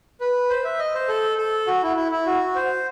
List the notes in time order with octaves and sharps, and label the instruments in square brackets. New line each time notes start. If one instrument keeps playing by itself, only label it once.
[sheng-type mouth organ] B4
C5
E5
D#5
C5
A4
A4
F#4
E4
E4
E4
F#4
C5